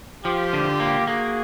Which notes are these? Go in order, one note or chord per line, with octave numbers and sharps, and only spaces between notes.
F3 F4 G4
D3
A#3
A#3 F#4 G#4